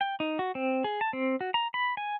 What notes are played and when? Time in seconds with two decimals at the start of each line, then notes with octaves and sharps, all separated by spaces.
0.01 G5
0.20 D#4
0.39 F#4
0.55 C4
0.84 G#4
1.01 A5
1.13 C4
1.41 F#4
1.54 A#5
1.74 B5
1.97 G#5